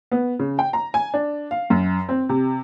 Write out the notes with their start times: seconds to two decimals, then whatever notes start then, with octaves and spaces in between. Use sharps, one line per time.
0.12 B3
0.39 C#3
0.59 G5
0.73 A#5
0.94 G#5
1.14 D4
1.51 F5
1.70 F#2
2.09 C4
2.29 C3